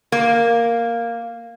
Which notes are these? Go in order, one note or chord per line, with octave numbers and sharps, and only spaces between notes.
A#3